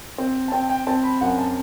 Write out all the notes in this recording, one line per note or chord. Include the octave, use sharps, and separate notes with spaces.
C4
A5
C4 G5
G5
C4 A5
B5
F#2 F#5
A5